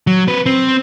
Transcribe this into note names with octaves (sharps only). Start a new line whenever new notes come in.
F#3
C4 B4
C4